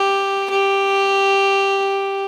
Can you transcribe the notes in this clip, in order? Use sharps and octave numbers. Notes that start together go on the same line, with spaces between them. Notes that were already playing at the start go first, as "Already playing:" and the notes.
Already playing: G4
G4